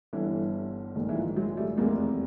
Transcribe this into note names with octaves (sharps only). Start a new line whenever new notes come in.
G1 G2 D3 E3
A#1 G#2 D#3
E3
F3
F#3 G#3
G3 A3
F1 E2 C3 G#3 A#3